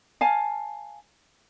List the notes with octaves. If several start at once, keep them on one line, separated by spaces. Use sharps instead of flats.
F5 G#5 A5